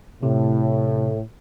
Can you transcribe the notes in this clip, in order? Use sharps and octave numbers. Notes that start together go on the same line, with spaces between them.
A2 C3